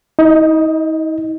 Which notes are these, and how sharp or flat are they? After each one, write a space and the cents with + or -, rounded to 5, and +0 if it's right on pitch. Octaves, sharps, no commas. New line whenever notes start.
D#4 +45 D#5 +0